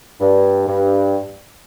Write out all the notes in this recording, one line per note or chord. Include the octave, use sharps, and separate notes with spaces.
G2
G2